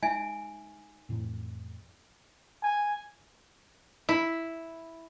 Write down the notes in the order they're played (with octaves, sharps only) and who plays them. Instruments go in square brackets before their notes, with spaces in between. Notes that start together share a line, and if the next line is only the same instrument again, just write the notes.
[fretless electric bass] G#3 [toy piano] D#4 E5 G#5
[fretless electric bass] F2 A2 E3
[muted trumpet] G#5
[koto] E4